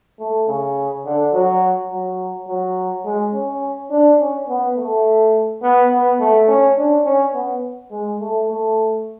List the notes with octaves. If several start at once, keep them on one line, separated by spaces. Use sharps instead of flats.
A3
C#3
D3
F#3
F#3
F#3
G#3
C#4
D4
C#4
B3
A3
B3
B3
A3
C#4
D4
C#4
B3
G#3
A3
A3